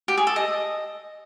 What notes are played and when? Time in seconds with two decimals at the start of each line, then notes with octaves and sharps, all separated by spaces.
0.08 G4
0.17 G#4
0.27 A4
0.36 D#5